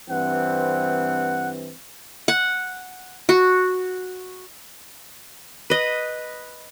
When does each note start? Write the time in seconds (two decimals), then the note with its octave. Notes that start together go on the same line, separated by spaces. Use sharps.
0.10 G2 E3 C4 F#5
2.28 F#5
3.29 F#4
5.70 B4 D#5